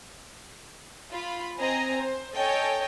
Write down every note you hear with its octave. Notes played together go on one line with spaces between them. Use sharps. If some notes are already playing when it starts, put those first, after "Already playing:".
F4 B5
C4 D#5 G#5 A#5
C5
A4 C#5 D#5 G5 G#5